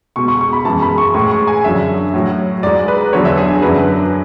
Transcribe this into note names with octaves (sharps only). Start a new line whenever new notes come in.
B2 G#3 C#6
C#6
C#6
B5
F#2 E3 G#3 A5
B5
C#6
A2 G#3 C#6
C#6
G#5
F#2 D3 F#3 E5
A2 F#3
G#2 G#3 D5
B4
E2 D3 F#3 C#5
E5
G#4
F#2 D3 F#3 B4